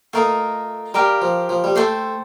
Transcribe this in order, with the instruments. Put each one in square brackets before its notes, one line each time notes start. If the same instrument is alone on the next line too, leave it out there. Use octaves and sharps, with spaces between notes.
[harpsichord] A3 [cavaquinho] F4 A#4 D#5
[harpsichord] G3 [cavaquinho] G4 A#4 F5
[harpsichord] F3
F3
G3
[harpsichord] A3 [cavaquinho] A4 C5 G5 C6